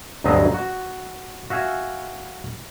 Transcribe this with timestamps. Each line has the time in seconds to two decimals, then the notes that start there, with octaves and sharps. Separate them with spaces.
0.24 D2 G2 F#3 C4 C5 D#5
0.54 F#4
1.50 F#4 E5 F5 G#5